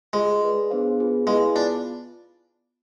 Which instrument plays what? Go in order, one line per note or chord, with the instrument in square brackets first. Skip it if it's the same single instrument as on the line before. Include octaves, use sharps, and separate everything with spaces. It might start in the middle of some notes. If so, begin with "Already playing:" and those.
[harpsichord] G#3 [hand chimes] F4 G#4 C5
[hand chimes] G#4 B4 D5
B3 D4 G#4 C5 F5
B3 F4 G#4 B4
[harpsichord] G#3 [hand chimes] E4 G#4 B4 F5 G#5
[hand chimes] B3 F4 [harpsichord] D4